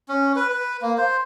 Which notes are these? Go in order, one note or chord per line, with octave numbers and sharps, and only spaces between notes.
C#4
B4
B4
A#3
C5